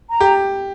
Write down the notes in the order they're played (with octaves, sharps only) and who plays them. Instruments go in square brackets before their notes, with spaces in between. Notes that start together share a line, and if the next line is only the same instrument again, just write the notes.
[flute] A#5
[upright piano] G4